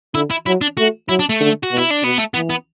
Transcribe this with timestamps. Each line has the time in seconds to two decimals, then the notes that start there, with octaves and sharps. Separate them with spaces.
0.15 D3 E4
0.30 E4
0.46 F#3 E4
0.61 D4
0.77 A3 F#4
1.09 F#3 E4
1.19 D4
1.29 A3
1.40 D3
1.63 F#4
1.72 B2
1.77 E4
1.91 D4
2.03 B2 B3
2.18 A3
2.34 E3 B3
2.50 B3